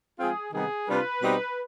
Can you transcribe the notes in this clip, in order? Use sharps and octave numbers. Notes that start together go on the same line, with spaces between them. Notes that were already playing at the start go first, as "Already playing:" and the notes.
F3 G#3 C4 F4 G#4
C3 D#3 G3 B3 D#4 G#4
C3 G3 D4 F4 B4
B2 G3 C4 D#4